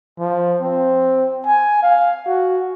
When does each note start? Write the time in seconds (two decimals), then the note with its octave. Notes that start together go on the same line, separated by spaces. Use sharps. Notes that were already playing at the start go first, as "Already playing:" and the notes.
0.19 F3
0.61 C4
1.46 G#5
1.82 F5
2.27 F#4